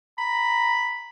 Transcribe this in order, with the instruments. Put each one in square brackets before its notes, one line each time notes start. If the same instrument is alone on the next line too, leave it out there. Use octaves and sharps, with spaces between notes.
[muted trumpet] A#5 [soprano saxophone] B5